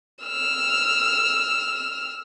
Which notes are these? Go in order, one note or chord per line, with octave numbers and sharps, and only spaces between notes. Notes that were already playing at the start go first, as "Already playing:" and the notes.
E6 F6